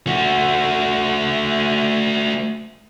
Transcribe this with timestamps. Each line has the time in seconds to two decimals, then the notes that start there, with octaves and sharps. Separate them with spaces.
0.07 A3 F#4